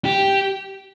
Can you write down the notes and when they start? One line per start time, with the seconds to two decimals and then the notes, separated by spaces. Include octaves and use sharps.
0.05 G4